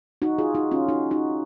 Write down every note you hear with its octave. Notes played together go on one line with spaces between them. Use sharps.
D#4 F#4
F4 G#4
D#4 F#4
C#4 F4
D#4 F#4
D#4 F#4